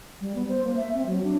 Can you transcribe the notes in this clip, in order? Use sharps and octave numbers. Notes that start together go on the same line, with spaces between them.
G3
B3
C5
A#3
E5
C4
F#3
D4